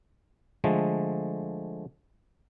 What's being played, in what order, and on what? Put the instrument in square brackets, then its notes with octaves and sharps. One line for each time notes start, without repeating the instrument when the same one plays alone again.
[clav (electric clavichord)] D3 F3 G#3 A3